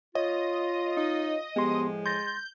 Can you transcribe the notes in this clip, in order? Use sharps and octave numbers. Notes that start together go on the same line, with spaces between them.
F4 C#5 D#5
D#4
A2 F3 G#3 B3 G4 C6
C6 G6 A6 A#6